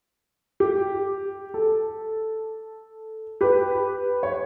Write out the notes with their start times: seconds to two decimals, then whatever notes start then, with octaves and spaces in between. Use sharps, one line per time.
0.60 G4
1.54 A4
3.41 G4 B4
4.23 C#5